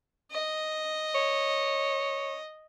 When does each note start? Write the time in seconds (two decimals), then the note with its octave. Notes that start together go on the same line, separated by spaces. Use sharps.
0.31 D#5
1.15 C#5